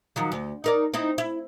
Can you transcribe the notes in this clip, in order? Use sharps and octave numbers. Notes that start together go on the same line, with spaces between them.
D#3 F3 F#3
D2
D#4 A#4 D5
C4 D#4 E4
E4